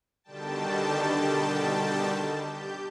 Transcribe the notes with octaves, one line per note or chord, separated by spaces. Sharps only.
B2 D3 D#3 G3 G5 A5
G4 G6